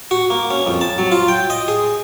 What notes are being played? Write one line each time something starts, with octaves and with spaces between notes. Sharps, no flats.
F#4
A#3
C#4
F2
A5
F#3
F4
G5
D#5
G#4